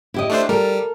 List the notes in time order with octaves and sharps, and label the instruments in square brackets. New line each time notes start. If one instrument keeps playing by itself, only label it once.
[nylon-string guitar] E4 G4 D#5
[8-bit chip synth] A3 D4 C5
[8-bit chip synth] G3 [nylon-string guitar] A4 A#4